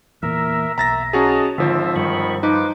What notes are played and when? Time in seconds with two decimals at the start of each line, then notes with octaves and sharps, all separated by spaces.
0.23 E2 A#2 A#4 E5
0.78 B1 E5 A#5 A6 A#6
1.13 C#4 F#4 G#4 D#5 A5 A#5
1.58 G#1 D3 F3 C5 E5
1.96 G2 D#3 B5 C#6
2.43 F3 D#4 B4 D6